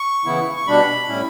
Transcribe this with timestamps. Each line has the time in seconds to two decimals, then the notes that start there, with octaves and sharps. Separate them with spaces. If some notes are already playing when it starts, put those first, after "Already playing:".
Already playing: C#6
0.25 C#3 E3 B3 E4
0.57 C#6
0.67 B2 G3 D4 B5
1.07 A2 G3 C#4 E4